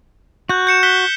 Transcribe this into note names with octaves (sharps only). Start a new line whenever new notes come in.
F#4 F#6 G6
G6 C#7 E7
F#6 B6 G7